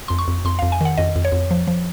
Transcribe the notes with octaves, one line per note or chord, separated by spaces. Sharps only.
F2 C6
C#6
F2
F2 C6
F2 F5
G#5
D#3 F#5
F2 D#5
F2
C#5
F2
F3
F3